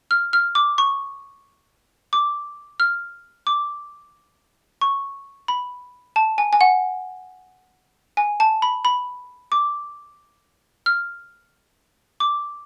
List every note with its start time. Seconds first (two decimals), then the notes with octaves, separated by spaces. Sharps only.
0.11 F6
0.33 F6
0.55 D6
0.78 C#6
2.13 D6
2.80 F6
3.47 D6
4.81 C#6
5.48 B5
6.16 A5
6.38 G#5
6.53 G#5
6.61 F#5
8.17 G#5
8.40 A5
8.62 B5
8.85 B5
9.52 D6
10.86 F6
12.20 D6